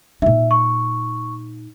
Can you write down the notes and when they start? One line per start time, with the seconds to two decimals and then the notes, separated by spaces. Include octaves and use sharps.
0.22 A#2 D#4 E5
0.51 C#6